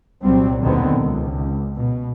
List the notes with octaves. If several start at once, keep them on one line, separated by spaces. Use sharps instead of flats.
C2 A#2 F#3 G3 C4
D#2 B2 D3 D#3 B3 C4
C#2
B2